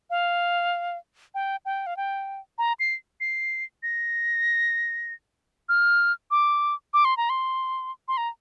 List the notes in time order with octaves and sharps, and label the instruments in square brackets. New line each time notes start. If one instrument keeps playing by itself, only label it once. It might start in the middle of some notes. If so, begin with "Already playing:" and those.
[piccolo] F5
G5
G5
F5
G5
A#5
C7
C7
A#6
F6
D6
D6
C6
A#5
C6
C6
A#5